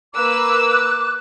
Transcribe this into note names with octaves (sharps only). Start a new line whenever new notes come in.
A#3 B4 D6 E6 F#6